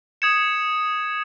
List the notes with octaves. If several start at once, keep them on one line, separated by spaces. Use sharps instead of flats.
D#6 G#6 C#7 E7